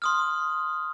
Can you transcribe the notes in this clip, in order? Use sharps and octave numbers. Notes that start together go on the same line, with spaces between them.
C6 D#6 F6